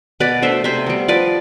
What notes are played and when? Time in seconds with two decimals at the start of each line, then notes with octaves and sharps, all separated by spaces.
0.20 B2 B4 D5
0.42 A3 D4 C5 E5
0.64 C3 C5 E5
0.86 G3 B3
1.08 F3 B4 D5